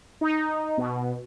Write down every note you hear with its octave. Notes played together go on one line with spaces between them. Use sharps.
D#4
B2